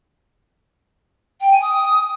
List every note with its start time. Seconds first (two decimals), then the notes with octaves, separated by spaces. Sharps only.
1.40 G5
1.51 G#5
1.61 D#6